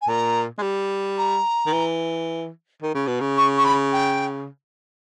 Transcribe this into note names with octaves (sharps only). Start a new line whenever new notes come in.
G#5
A#2 A#5
G#3
G3
A#5
D#3
E3
D#3
C#3
B2
C#3
C#6
C#6
B5
G5